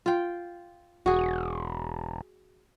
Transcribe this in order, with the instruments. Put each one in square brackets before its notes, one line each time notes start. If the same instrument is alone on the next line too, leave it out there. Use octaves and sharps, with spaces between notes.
[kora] F4 G5
[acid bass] E1 [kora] F#4 G#4